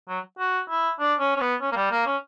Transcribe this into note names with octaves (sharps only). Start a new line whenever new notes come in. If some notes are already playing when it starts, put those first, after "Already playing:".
F#3
F#4
E4
D4
C#4
C#4
B3
C#4
A#3
G3
A#3
C#4